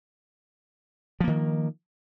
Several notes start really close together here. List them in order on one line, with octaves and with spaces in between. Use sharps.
F3 A#3 D#3